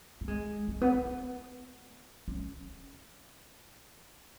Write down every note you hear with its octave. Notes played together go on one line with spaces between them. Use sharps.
A3
G#3
A3
B3
A3
C#4